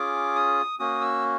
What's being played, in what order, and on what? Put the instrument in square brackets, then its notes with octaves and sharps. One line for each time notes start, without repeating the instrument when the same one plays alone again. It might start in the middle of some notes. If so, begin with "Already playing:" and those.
Already playing: [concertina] C#4 F4 G#4 D6
D#6
A#3 C#4 F#4 D#6
E6